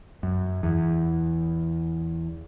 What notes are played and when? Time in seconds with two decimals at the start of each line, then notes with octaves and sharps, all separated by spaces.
0.23 F#2
0.63 E2